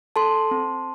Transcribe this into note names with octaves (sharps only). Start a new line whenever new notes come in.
A4 A5 C6
C4